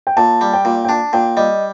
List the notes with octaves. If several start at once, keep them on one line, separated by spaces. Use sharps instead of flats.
G5
A#2 A5
G3
G5
A#2
G5
D4 A5
A#2 G5
G3 D#5